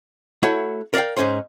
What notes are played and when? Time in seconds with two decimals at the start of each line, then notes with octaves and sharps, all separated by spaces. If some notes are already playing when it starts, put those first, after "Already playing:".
0.43 A3 E4 F#4 C#5 F#5
0.94 A#4 D5 E5 F5 G5
1.17 G#2 C3 C#4 C5 C6